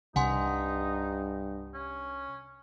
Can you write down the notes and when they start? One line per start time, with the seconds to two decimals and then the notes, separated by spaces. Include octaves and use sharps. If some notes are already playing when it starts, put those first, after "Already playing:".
0.16 C2 G2 D#4 F#5 G#5 C6
1.74 C#4